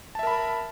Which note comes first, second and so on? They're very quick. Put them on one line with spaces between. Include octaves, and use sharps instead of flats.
A5 E5 A#4 B5